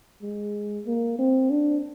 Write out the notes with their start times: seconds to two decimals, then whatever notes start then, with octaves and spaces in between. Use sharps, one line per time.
0.22 G#3
0.86 A#3
1.19 C4
1.50 D4